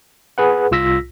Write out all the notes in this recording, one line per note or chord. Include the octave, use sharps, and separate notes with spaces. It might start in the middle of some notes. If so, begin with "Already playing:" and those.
G#4 B4 F#5
C2 F4 E6 A#6 B6